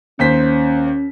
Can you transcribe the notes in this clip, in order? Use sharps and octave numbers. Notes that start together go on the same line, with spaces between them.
D#2 C#4 C5 B6